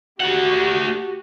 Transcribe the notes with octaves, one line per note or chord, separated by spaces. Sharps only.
A3 F#4 G4 F#5